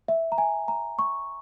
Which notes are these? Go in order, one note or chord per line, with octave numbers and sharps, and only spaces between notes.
E5
A#5
G#5
A#5
C#6